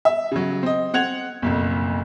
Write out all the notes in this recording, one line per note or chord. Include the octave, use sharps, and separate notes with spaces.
E5
C#3 F#3
C4 D#5
C4 F#5 G#6 F7
F#1 B1 F2